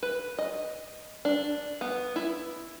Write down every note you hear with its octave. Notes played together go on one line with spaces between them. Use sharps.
B4
D#5
D4
B3
E4